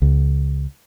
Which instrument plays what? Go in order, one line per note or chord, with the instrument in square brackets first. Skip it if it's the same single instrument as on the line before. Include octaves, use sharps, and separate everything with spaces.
[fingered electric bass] C#2